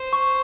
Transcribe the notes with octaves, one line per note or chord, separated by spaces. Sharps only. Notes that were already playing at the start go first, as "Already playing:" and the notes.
Already playing: C5
C#6